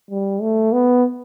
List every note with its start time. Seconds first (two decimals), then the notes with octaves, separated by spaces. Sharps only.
0.11 G3
0.41 A3
0.72 B3